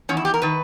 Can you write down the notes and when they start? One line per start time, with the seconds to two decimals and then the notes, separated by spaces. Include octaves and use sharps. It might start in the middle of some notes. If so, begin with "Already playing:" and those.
0.09 E2 D#3 C#4
0.17 E4
0.25 G4
0.34 A#4
0.42 D#3 B4